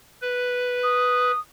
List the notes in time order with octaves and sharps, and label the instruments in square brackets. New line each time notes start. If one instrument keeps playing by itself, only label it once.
[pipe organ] B4
[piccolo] D#6